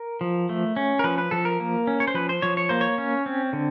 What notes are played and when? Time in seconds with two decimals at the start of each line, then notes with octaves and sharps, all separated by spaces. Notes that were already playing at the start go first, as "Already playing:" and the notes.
Already playing: A#4
0.21 F3
0.49 A3
0.76 C#4
0.99 A#4
1.04 F3 B4
1.18 B4
1.31 F3 A4
1.45 A#4
1.60 A#3
1.87 C#4
2.00 C#5
2.08 C5
2.14 F3 B4
2.29 C5
2.42 F3 C#5
2.57 C#5
2.69 A#3 C5
2.81 C#5
2.98 C#4
3.26 C4
3.53 D3